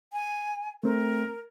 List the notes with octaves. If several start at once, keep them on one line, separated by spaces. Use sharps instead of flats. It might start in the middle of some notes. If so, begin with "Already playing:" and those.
G#5
A3 C4 A#4